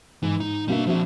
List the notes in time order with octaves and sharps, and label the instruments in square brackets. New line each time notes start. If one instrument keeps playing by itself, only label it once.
[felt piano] G#2 [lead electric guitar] E3
[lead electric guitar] D#4
[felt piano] B2 A#3 D4 [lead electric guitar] G3 E5
[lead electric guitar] F3 D4 [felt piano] C4 F#4 E5